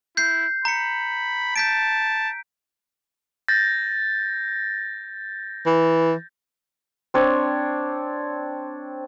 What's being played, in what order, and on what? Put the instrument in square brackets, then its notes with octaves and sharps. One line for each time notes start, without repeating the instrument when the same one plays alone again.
[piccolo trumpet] E4 [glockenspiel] G6 C7
[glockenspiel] A#5 C#7 [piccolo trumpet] B5
[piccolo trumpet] A5 [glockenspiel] G6 B6 D7
[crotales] G6 A6 A#6
[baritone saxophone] E3
[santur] C4 D4 C#5